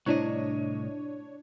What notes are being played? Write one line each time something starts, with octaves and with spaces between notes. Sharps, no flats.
C2 A2 D4 E4 C5 C#5 D#5